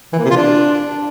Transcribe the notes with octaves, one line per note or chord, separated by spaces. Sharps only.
E3
A#3
C3
F4
D4